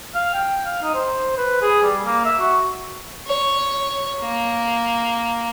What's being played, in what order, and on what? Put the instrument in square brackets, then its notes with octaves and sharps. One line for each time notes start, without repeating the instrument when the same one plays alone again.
[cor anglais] F5
G5
F5
D#4
C5
B4
G#4
G3
A#3
E5
F#4
[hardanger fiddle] C#5
A#3